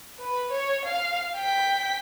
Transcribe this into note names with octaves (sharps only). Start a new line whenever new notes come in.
B4
C#5
F5
G5 B6